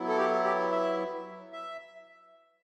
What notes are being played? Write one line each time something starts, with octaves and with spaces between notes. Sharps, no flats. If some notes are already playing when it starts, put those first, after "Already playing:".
Already playing: F#3 B3 E4
A4
G4
G4
E5
E5